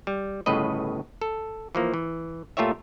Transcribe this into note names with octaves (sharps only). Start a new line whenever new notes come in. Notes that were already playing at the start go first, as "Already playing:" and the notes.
G3
G1 A2 C#3 B4 D#5
A4
E3 F3 A#3
E3
A#2 A3 F4 G4 C#5 E5